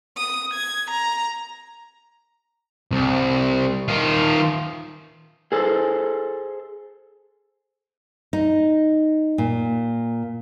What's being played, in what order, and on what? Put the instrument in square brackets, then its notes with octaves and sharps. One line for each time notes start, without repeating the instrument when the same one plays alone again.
[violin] D#6
G#6
A#5
[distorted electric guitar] C2
D#3 F4
[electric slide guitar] G#4 A4 C5
[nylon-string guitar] D#4
A#2